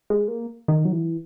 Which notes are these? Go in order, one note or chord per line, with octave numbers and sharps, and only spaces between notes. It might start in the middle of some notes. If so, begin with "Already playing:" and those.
G#3
A#3
D#3
F#3
E3